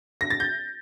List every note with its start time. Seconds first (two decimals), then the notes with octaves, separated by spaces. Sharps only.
0.21 A#6
0.30 A6
0.40 G6